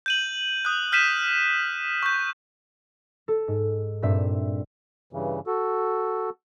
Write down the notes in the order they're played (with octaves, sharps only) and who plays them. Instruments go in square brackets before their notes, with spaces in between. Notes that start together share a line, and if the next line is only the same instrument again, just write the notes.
[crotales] G6 D#7 F#7
D#6 F#6
F6 G6 B6 D#7 E7
C#6 G6
[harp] A4
G#2
G2 A#2 C4 E5
[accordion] G2 C#3 E3
F#4 A4